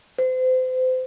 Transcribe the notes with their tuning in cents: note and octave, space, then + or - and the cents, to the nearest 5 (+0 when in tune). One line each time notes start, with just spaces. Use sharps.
C5 -35